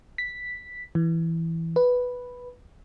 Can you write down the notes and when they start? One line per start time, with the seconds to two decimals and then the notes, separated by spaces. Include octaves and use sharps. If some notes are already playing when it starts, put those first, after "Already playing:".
0.18 B6
0.95 E3
1.76 B4